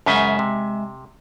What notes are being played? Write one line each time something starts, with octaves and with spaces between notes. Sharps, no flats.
F#2 C#3 G#3 E5 G#5
C3